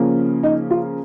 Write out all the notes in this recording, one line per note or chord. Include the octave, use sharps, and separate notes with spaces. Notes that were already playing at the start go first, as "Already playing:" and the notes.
Already playing: C#3 F3 A#3 C#4
D#4
F4